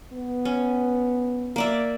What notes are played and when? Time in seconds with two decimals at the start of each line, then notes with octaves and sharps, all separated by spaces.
0.13 B3
0.45 C#4
1.56 A#3 D5 E5